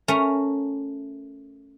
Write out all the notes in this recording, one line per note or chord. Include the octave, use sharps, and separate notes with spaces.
A3 C#4 A#4 A#5